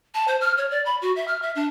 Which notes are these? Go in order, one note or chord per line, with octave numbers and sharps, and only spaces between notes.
A5
C5
F6
C#5
D5
B5
F#4
E5
F6
E5
D4